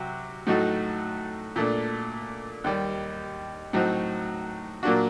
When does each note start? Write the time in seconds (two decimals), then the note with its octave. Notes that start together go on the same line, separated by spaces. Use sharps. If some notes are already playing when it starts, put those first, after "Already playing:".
Already playing: C3 F#3 F#4
0.47 A2 F#3 A3 D#4 F#4
1.56 A#2 A3 D4
2.64 D#2 D#3 G3
3.73 A2 F#3 C4 D#4 F#4
4.83 A#2 F#3 A#3 D4 F#4